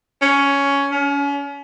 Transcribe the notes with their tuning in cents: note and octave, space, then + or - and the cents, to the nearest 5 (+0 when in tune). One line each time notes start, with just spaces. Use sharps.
C#4 +10
C#4 +35